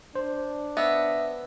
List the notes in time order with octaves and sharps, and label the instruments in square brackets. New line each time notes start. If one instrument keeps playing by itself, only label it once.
[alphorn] D4 [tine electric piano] C5
[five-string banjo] B3 [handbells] D#5 E5 E6